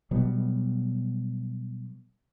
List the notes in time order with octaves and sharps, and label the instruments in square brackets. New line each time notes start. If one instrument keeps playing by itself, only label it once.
[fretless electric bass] B2 F#3 G3 B3